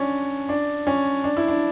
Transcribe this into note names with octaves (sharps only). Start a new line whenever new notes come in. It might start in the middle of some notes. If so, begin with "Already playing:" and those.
Already playing: C#4 D4
D4
C#4
D4
E4
D4